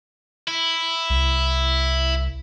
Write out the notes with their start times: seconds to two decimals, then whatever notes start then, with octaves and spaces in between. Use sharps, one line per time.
0.48 E4
1.10 C2